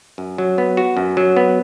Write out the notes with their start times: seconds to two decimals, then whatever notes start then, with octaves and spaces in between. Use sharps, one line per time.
0.18 F#2
0.38 F#3
0.58 B3
0.77 F#4
0.97 F#2
1.17 F#3
1.37 B3